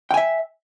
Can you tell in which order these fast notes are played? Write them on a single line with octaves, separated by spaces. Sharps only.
G5 G#5 E5